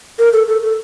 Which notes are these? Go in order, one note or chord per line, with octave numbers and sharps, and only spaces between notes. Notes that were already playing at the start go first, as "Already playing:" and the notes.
A#4
A4
A4
A4